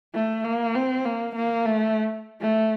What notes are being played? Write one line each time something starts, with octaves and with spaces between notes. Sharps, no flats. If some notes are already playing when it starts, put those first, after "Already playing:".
A3
A#3
C4
A#3
A#3
A3
A3